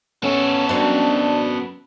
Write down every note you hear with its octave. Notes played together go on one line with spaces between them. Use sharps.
B3 C#4 A4
F#2 C4 D4